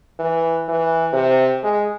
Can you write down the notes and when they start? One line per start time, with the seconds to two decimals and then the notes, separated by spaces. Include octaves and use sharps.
0.19 E3
0.68 E3
1.13 C3
1.63 G#3